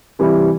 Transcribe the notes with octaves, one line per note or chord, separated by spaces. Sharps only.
C3 E3 G3 E4